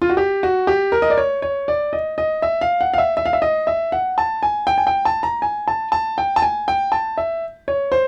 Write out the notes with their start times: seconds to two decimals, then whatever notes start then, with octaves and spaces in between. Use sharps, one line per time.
0.02 F4
0.10 F#4
0.17 G4
0.43 F#4
0.67 G4
0.92 A#4
1.02 D#5
1.10 D5
1.18 C#5
1.42 C#5
1.68 D5
1.93 D#5
2.18 D#5
2.42 E5
2.61 F5
2.81 F#5
2.94 F5
2.98 E5
3.17 E5
3.26 F5
3.33 E5
3.42 D#5
3.67 E5
3.92 F#5
4.18 A5
4.43 G#5
4.67 G5
4.78 G#5
4.87 G5
5.05 A5
5.23 A#5
5.42 G#5
5.68 A5
5.92 A5
6.18 G5
6.36 A5
6.42 G#5
6.68 G5
6.92 A5
7.18 E5
7.68 C#5
7.92 C5